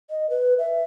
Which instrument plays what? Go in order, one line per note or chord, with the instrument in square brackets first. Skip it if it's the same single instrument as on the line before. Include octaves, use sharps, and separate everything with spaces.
[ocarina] D#5
B4
E5